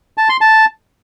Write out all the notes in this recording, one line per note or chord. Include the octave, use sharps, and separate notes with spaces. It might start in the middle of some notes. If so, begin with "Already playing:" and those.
A5
C6
A5